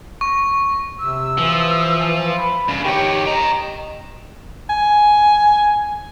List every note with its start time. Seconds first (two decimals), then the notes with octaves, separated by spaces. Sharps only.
0.21 C#6
0.99 C3 E6
1.38 E3 F3
2.37 B5
2.68 G2 C#3
2.84 D#3 G4 C#5 G5
3.26 D#5 G5 A#5
4.69 G#5